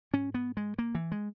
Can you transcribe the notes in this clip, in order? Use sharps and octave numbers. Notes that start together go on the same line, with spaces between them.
G#2 C#4
B3
G#3
A#3
E3
G#3